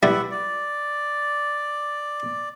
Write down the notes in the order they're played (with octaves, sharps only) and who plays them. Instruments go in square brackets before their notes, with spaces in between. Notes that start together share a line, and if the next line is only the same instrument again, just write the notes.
[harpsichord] G3 E4 [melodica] B3 E5 F#5
[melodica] D5